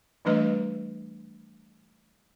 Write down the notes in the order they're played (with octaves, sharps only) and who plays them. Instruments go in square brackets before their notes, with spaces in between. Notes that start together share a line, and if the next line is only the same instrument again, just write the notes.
[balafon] E3 G3 A3 D4 B4 D#5